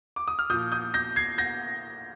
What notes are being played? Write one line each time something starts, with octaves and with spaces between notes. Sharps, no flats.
D6
D#6
F6
A#2 F3 D#6 G6
D#6 G6
G6 A#6
G#6 C7
G6 A#6